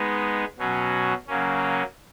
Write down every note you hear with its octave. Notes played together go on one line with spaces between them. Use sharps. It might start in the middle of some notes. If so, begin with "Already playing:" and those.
Already playing: G#3 B3 D#4
B2 F#3 C#4 F#4
C#3 F#3 A#3 C#4